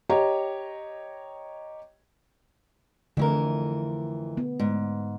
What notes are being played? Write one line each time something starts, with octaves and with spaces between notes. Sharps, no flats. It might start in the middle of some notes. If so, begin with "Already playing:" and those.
G4 C#5 D#5 A#5
F2 D3 E3 A3 A#4
B3
G#2